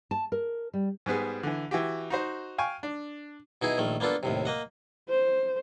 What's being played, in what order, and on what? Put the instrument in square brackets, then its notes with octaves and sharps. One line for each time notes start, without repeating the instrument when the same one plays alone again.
[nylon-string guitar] A5
A#4
G3
[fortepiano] G#2 G3 B3 G#4
D3 E3
E3 F#4 G4
D#4 F#4 C5
F5 G5 G#5 C#6
D4
[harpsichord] B2 D#4 E4 G#4
A#1 D#3 A3
A#3 B3 D4 F4 A4
D#2 A2 C3
A#3 D#5 F#5
[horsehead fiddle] C5